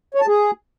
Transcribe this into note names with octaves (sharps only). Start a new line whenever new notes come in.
C#5
A5
G#4